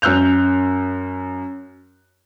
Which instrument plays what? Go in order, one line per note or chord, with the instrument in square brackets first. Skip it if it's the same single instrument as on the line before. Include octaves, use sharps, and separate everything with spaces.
[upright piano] F#2 E6 F#6 G6 F7